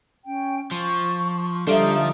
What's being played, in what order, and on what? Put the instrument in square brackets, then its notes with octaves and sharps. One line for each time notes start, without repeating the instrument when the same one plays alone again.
[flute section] C#4 G5
[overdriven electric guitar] F3 [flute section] C#6
[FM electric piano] D3 F5 D6 [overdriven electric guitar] F3 [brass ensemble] G3 E5 [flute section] D#4 A4